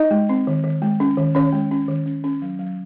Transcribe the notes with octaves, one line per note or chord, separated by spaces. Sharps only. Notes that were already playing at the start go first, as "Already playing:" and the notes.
Already playing: D#4 D#5
G#3
C4
D#3
D#3
G#3
C#4
D#3
D#3 C#4 C#5
G#3
C#4
D#3
C#4
C#4
F#3
F#3